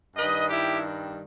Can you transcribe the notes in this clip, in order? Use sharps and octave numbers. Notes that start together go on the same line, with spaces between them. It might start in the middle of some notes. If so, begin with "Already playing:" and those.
G2 D#3 G3 B4 D#5
E4 G4